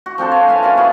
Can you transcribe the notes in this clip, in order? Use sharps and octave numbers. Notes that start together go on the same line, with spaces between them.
F#4
F3 C4 D4 A4
C#5
B4 E5 F5 G#5
C#4 F#4 D5 F5
A#3 B3 E4 F#4